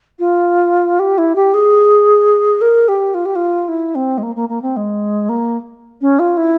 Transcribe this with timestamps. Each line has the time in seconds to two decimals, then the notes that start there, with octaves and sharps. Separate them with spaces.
0.19 F4
0.99 G4
1.18 E4
1.35 G4
1.54 G#4
2.61 A#4
2.88 G4
3.14 F4
3.25 G4
3.35 F4
3.68 E4
3.95 C4
4.18 G#3
4.23 A#3
4.36 A#3
4.49 A#3
4.62 C4
4.76 G#3
5.29 A#3
6.01 C#4
6.19 F4
6.37 E4